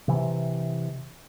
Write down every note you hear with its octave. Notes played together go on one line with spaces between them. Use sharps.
C3 E3